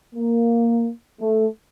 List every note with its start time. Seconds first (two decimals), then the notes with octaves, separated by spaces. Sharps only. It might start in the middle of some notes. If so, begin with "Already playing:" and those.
0.15 A#3
1.21 A3